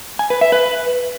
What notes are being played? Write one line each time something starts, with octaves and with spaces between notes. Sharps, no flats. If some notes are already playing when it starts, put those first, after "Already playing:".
G#5
B4
E5
B4